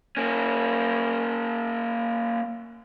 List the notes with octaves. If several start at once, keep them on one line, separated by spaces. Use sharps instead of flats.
A#3 C#4